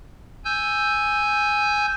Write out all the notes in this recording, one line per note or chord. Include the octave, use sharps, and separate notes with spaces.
G#5 E6 G6